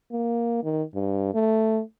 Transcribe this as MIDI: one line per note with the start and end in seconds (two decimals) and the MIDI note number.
0.12 0.61 58
0.64 0.82 51
0.95 1.32 43
1.34 1.81 57